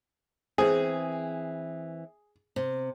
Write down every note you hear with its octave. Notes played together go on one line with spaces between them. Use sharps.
E3 C4 G#4
C3